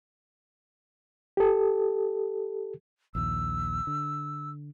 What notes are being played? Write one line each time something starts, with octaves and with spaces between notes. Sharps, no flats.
G4 A4
A#1 D#2 E6
D3